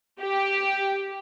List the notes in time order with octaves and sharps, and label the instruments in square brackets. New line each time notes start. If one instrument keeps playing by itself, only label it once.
[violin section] G4